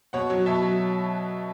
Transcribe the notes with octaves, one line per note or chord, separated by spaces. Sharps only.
B2 C#5 F#5
F#3
B2 E5 A5
F#3